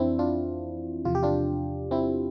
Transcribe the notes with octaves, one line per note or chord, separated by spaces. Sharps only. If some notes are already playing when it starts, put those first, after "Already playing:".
Already playing: F2 E3 C4 D4 E4
D4 F4
E2 C3 F3 F4
G4
D4 F4
C4 E4